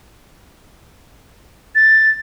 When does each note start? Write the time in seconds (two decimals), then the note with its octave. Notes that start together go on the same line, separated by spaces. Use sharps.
1.75 A6